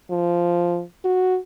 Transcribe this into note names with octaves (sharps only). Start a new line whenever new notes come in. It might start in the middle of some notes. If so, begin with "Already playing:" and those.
F3
F#4